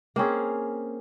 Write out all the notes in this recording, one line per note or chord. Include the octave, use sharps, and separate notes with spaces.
A#3 C4 C#4 G#4